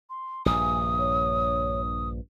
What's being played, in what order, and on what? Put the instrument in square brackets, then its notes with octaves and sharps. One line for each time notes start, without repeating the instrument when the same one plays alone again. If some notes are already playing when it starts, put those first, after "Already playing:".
[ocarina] C6
[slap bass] A#1 G2 [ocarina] G#5 [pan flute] D#6
[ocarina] C#5